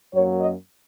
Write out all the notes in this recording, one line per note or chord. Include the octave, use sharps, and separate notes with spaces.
F#2 F#3 A#3 C#5
D#5